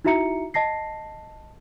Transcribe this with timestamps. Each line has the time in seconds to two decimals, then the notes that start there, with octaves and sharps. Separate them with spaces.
0.04 D#4 E4 F#4 E5 A#5 C#7
0.54 D#5 A5 A#6 C7